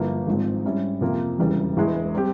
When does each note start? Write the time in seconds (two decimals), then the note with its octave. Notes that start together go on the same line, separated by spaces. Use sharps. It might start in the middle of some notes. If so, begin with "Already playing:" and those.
Already playing: G1 G2 F3 A#3 E4
0.27 G#1 G#2 F3 G#3 C4
0.64 G#2 G3 C#4 E4
1.01 F2 C3 F3 A#3 F4
1.39 E1 E2 C#3 E3 G3
1.76 E1 E2 E3 G#3 E4
2.15 G3 C4 G4